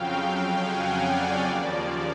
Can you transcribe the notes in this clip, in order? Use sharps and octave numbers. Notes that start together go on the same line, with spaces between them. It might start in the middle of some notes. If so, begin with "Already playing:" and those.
Already playing: F2 C#3 F#3 F5 G5
F#5 G#5
D5
D#2 C#3 F3 A#3 D5